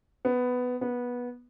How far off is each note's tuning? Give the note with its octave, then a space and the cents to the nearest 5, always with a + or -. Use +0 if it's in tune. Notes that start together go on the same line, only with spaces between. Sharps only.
B3 +10
B3 -15